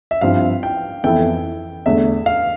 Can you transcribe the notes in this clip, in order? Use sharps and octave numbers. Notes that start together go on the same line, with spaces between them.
E5
G2 F3 C4 E4 F5
G5
F2 E3 B3 E4 A4 G5
E2 D3 A3 E5
F5